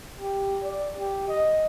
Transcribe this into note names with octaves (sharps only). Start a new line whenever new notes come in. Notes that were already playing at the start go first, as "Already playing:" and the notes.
G4
D5
G4
D#5